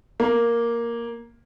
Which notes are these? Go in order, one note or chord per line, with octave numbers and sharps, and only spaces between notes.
A#3